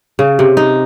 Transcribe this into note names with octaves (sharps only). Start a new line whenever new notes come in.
C#3
C3
D#4